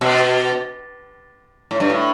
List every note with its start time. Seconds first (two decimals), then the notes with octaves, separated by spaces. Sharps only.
0.01 B2
1.71 A2
1.80 G2
1.90 A2